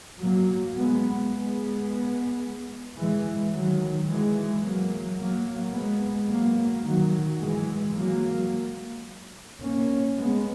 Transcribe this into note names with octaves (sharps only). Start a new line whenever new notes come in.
F#3 A#3
G#3 B3
G#3 B3
E3 G#3
D#3 F#3
E3 G#3
F#3 A#3
F#3 A#3
G#3 B3
F#3 A#3
D#3 F#3
E3 G#3
F#3 A#3
A#3 C#4
G#3 B3